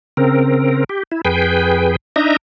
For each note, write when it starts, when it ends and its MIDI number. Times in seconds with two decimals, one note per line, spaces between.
0.17 0.84 49
0.17 0.84 60
0.17 0.84 70
0.89 1.03 67
1.12 1.21 64
1.25 1.96 41
1.25 1.96 68
1.25 1.96 71
1.25 1.96 79
2.16 2.36 62
2.16 2.36 63
2.16 2.36 75
2.16 2.36 76
2.16 2.36 82